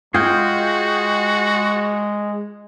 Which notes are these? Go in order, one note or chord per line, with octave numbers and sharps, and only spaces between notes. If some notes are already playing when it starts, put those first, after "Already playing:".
G#3 F4 F#4 G#4 G5